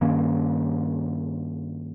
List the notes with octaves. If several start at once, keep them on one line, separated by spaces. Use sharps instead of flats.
G2 D#3 A#3 C#4